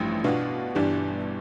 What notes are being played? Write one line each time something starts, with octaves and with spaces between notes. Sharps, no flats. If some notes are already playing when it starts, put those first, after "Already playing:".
Already playing: A1 G2 F3 A3 E4
B2 B3 D4 F4
G1 G2 E3 G3 D4